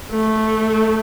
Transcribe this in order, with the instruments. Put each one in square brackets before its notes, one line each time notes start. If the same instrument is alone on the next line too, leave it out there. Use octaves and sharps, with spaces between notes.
[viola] A3